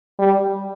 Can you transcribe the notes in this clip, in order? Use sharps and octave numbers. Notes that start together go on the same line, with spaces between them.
G3